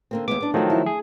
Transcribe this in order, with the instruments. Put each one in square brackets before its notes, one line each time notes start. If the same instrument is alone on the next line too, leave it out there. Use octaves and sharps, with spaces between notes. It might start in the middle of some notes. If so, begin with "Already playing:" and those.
[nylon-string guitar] D3 A#3 C4
[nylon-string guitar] D#2 G#3 B3 [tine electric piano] D6
[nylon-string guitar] B3 D4
[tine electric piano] D#3 F3 F#3 [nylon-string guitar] A3 C4
[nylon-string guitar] E4
[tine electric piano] G#4